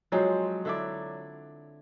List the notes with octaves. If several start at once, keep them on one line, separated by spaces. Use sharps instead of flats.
F3 F#3 G#3 C4
D3 E4 D5